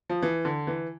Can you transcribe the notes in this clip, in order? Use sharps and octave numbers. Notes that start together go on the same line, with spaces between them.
F3
E3
D3
E3